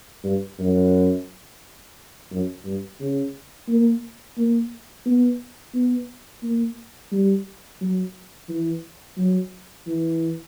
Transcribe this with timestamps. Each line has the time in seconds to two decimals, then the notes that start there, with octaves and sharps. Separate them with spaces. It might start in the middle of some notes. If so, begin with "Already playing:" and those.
0.24 G2
0.59 F#2
2.31 F#2
2.65 G2
3.00 C#3
3.68 A#3
4.37 A#3
5.05 B3
5.74 B3
6.42 A#3
7.12 G3
7.81 F#3
8.49 E3
9.17 F#3
9.86 E3